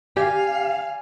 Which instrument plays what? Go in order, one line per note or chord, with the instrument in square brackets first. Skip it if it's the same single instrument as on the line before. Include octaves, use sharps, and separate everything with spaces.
[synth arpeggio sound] G4 [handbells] D5 G#5 G#6 [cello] F5